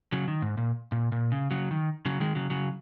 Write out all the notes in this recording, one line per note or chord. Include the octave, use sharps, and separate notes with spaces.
C#3 F#3
D#3
G#2
A#2
A#2
A#2
C#3
C#3 F#3
D#3
C#3 F#3
D#3 G#3
C#3 F#3
C#3 F#3